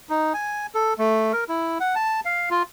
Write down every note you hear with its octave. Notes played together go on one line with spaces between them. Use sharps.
D#4
G#5
A4
A3
A#4
E4
F#5
A5
F5
F4